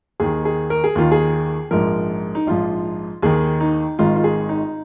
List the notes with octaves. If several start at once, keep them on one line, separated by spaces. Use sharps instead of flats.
D#2 D#3 G#4
G#4
A#4
G#4
D#2 D#3 F4
G#4
A#1 G#2 F3 A#4
D#4
A#1 G#2 F3 F4
D#2 D#3 G#4
D#4
G#1 G#2 D#3 F4
F4
G#4
D#4